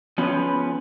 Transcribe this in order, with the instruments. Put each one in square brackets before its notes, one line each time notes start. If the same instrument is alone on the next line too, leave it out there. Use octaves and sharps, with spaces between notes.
[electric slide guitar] F3 B3 C#4 B4